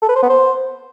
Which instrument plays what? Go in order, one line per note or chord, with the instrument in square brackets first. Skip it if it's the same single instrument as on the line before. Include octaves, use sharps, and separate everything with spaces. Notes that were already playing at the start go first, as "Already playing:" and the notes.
[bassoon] A4
B4
C5
B3
C5